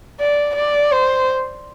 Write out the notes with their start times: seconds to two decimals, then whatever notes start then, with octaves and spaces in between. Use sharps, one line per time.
0.20 D5
0.56 D5
0.91 C5